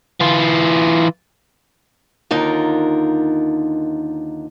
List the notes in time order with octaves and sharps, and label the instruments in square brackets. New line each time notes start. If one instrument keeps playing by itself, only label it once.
[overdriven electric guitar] E3 F4
[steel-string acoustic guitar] D#2 D3 D#4 F4 A#4